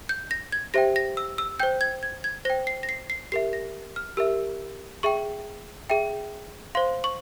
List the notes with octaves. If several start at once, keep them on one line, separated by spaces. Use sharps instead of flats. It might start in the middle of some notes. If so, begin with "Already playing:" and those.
G6
A#6
G#6
G4 C5 E5 G5 A#6
A#6
E6
E6
C5 G5 G6
G#6
G#6
G#6
C5 G5 A#6
C7
A#6
C7
C7
G4 A#4 E5 C7
A#6
F6
G4 A#4 E5 E6
G#4 E5 G5 C#6
G#4 E5 G5
C5 F5 C6
C#6